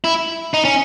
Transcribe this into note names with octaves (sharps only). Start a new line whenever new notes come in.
E4
D#4
C#4